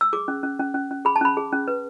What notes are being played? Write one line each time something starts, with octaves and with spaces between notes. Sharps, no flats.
E6
G#4 D6
C#4
C#4
C#4
C#4
C#4
G#4 B5
A5
C#4 B5
G#4
C#4
B4